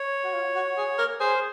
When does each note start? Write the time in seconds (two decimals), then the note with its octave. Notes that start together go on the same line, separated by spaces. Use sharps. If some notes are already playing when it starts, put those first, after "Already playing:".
Already playing: C#5
0.24 F#4
0.34 F4
0.55 F#4
0.77 G#4
0.98 A#4
1.20 G#4 C5